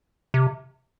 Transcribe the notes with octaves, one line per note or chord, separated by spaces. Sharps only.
C3